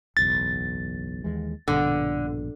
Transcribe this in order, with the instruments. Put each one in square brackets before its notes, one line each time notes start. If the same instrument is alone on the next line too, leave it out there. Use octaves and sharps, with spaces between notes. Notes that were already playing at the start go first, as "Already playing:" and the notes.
[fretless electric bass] F#1 B1 E2 [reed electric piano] A6
[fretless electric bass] D#2 E3 G#3
[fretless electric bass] A#1 G2 B2 [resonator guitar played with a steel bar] D3